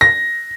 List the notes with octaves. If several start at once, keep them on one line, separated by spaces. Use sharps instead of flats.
A#6